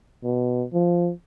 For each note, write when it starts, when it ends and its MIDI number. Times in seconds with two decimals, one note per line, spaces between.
0.23 0.64 47
0.73 1.10 53